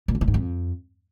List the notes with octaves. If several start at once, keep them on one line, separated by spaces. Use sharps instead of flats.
A#2
F2
A2
G#2
F2